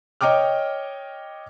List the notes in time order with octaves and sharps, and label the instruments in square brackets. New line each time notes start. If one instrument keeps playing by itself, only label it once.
[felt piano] C#5 D#5 G5 D6 F6